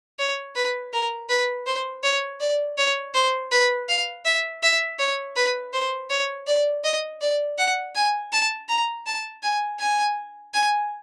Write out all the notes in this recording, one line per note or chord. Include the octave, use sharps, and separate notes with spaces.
C#5
B4
A#4
B4
C5
C#5
D5
C#5
C5
B4
F5
E5
E5
C#5
B4
C5
C#5
D5
D#5
D5
F#5
G#5
A5
A#5
A5
G#5
G#5
G#5